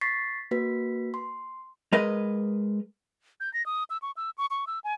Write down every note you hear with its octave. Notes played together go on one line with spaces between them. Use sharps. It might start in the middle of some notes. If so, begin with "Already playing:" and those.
C#6 A6 B6 C7
A#3 F#4 B4 B6
C6
G#3 A#4 B4 D#5
G6
A#6
D#6
E6
C#6
E6
C#6
C#6
E6
G#5